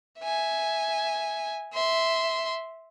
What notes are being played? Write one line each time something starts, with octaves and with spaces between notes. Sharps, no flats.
E5 G#5
E5 C6